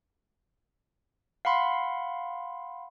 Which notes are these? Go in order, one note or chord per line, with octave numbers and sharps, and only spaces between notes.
F5 F#5 B5 C6